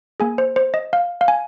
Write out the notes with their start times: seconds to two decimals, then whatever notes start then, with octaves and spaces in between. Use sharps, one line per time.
0.20 A#3 G#4 G#5
0.38 C5
0.56 C5
0.74 D#5
0.93 F5
1.21 F5
1.28 G#5